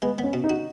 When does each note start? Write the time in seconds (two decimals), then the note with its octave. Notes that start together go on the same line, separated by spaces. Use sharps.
0.02 G#3 B3
0.18 B3
0.24 C#4
0.33 B2
0.44 D#4
0.49 F#4